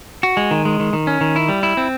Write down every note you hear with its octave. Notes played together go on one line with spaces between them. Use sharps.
F#4
G#3
D#3
G#3
D#3
D#3
C#4
D#3
E4
G3
E4
C4